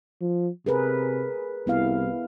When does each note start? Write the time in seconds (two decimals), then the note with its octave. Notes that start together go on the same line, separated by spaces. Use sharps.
0.21 F3
0.66 C3 G#4 A#4 B4
1.67 C2 B3 E4 F5